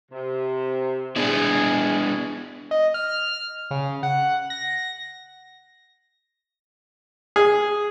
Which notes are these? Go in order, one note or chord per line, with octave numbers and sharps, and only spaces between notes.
C3
B3 D4 E4 G#4
D#5
F6
C#3
F#5
A#6
G#4